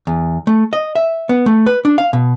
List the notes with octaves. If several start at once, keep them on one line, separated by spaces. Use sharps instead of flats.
E2
A3
D#5
E5
B3
A3
B4
D4
F5
B2